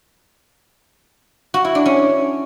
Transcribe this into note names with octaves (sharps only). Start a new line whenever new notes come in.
F#4
E4
D4
C#4